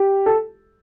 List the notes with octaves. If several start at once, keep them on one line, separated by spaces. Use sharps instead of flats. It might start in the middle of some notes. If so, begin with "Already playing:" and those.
Already playing: G4
A4